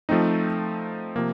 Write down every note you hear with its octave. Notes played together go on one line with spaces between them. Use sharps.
F3 A3 C4 D#4
C3 F3 A#3